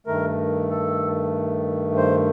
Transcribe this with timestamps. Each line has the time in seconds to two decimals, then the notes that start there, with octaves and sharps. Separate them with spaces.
0.07 G2 D#3 A3 A#4
0.70 A4
1.97 C5